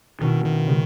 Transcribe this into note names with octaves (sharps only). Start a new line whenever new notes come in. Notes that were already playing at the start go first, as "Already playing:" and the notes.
B2 D#3 A#3 C#4 E4
D#3
C#3 G#3